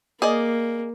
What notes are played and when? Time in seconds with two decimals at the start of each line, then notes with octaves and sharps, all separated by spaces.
0.22 A#3 G#4 D5 D#5